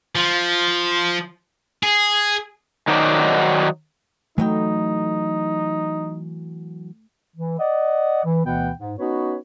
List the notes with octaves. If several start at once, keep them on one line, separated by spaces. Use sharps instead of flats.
F3
G#4
D#3 F#3 D#4 F#4 C5 D5
E3 F#3 A3 D#4 G5
E3
D5 D#5 F#5
E3
D2 B2 E3 B3 F#5 G5
G#2
B3 C#4 D#4 F#4 B4 C#5